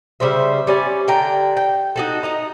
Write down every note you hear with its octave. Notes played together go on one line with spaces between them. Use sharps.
C#3 G3 C5 E5
G3 C#4 D5
D3 G5 A#5
G5
D#4 F#4 A4
D#4 D#5 A#5